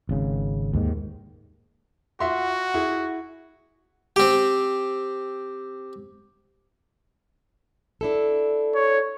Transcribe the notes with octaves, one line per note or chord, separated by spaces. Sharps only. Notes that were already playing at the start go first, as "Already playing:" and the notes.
G#1 C#3
D#2 G#2 D#3
F4 F#4 E5 C6
E4 G#4
C4 G4
D4 E4 A4
C#5